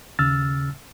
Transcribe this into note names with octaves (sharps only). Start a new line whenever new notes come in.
D#2 C#3 E6 F6 A6